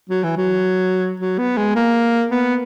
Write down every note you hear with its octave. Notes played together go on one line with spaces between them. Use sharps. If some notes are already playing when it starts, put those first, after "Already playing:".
F#3
E3
F#3
F#3
B3
G#3
A#3
B3